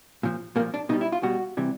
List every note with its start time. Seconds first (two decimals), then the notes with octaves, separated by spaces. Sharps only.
0.23 A#2 F3
0.56 A#2 A#3
0.60 F3
0.74 D4
0.89 B2 D#4
0.93 G3
1.01 E4
1.12 F4
1.23 B2 G3 F#4
1.57 C3 E3 G3